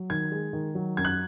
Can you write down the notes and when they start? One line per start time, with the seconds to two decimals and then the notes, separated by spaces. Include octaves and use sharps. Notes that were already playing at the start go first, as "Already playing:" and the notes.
Already playing: F#3
0.10 D#3 G#6
0.32 G#3
0.53 D#3
0.75 F#3
0.97 F#2 G#6
1.05 F#6